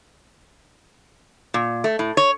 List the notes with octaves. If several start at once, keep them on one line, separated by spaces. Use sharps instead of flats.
A#2
A3
A2
C#5